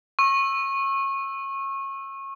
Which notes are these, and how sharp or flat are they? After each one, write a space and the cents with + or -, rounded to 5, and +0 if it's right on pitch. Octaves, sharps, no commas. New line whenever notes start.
C#6 -25 E6 +0